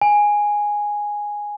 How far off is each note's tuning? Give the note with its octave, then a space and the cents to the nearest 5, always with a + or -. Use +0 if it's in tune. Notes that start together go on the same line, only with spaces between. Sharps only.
G#5 -5